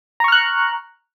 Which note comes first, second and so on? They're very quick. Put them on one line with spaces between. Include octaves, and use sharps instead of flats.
A#5 C#6 F6 F#6